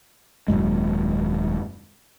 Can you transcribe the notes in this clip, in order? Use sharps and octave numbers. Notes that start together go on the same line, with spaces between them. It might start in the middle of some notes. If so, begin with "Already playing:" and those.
D#1 B1 F#2 G#3